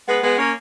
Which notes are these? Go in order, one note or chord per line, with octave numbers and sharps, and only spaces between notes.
G#3 B3
G#3 B3
A#3 C#4